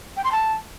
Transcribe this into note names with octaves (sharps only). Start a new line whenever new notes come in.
G5
C6
A5